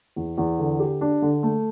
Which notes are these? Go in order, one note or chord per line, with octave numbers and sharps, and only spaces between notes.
E2
E2
D3
G4
D4
D3
A3